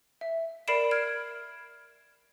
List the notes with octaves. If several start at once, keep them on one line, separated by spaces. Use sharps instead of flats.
E5
A#4 D5 B5 C7 D7 E7
F6 G#6 D7